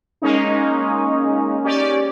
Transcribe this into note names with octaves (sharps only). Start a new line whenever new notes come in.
G#3 A#3 C#4 D#4
C#4 G4 D5